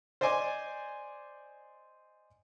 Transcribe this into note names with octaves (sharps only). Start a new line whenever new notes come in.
C5 D5 D#5 G#5 C6 D6